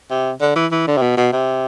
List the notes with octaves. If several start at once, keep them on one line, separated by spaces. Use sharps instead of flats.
C3
D3
E3
E3
D3
C3
B2
B2
C3